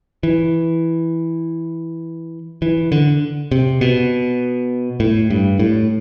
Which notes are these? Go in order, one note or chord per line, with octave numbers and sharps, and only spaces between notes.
E3
E3
D3
C3
B2
A2
G2
A2